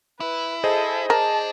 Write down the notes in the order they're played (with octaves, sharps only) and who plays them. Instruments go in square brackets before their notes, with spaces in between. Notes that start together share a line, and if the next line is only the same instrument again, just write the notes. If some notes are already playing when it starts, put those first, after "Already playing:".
[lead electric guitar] E4 [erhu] B4
[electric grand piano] G#4 C5 D#5 [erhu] A4
[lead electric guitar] D4 [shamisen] A#4 [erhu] A5